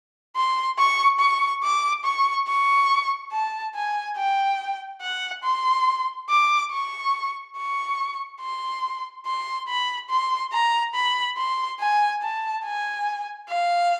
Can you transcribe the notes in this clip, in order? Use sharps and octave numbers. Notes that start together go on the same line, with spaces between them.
C6
C#6
C#6
D6
C#6
C#6
A5
G#5
G5
F#5
C6
D6
C#6
C#6
C6
C6
B5
C6
A#5
B5
C6
G#5
A5
G#5
F5